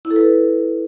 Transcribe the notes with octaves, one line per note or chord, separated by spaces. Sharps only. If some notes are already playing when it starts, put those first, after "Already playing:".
E4
A4
B4